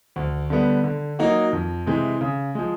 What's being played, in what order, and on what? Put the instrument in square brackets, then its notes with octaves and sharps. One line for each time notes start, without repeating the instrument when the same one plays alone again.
[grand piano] D2
D3 G3 B3
D3
F#3 A#3 D#4 F#4
F2
C3 E3 G#3 C4
C#3
F3 G#3